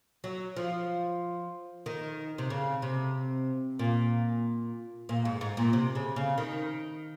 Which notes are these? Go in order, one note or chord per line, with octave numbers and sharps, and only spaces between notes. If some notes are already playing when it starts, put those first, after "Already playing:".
F#3
F3
D#3
C3
C#3
C3
A#2
A#2
G#2
G#2
A#2
C3
C#3
C#3
D#3